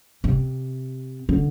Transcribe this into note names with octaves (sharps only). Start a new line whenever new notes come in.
C3
D3